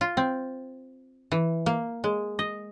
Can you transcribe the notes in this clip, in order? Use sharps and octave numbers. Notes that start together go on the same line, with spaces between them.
F4
C4
E3
A#3
G#3
D#5